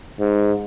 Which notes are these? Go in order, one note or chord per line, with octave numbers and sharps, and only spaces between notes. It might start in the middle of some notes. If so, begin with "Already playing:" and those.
G#2